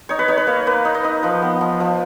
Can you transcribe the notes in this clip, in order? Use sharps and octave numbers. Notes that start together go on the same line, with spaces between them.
D#4 C#5
B4
D#4 C#5
B4
A#3
A#3 B4
D#4
D#5
D#4
F3 B4
B3
F3
F3